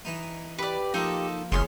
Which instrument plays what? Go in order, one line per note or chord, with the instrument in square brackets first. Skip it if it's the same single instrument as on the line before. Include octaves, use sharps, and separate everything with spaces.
[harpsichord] E3 D#4
[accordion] G4 [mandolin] B4 D5
[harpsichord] F3 A#3 [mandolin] D#4 A4
[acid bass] F#1 [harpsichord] E2 C#4 [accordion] G#4 [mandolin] C6 C#6 F6